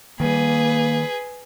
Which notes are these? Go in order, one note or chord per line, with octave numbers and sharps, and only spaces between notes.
D#3 G3 A#3 G#4 B4